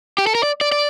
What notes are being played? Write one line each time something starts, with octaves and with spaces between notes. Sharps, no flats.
G4
A4
A#4
D5
D5
D5